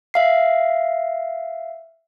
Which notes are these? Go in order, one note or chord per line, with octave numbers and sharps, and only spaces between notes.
E5 F5 C7